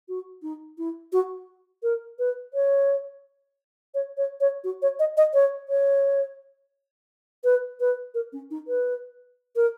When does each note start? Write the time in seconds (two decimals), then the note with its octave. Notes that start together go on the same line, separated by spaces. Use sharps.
0.09 F#4
0.43 D#4
0.78 E4
1.13 F#4
1.83 A#4
2.19 B4
2.54 C#5
3.95 C#5
4.17 C#5
4.41 C#5
4.64 F#4
4.82 C#5
4.99 D#5
5.17 D#5
5.34 C#5
5.69 C#5
7.44 B4
7.80 B4
8.14 A#4
8.33 C#4
8.51 D#4
8.68 B4
9.56 A#4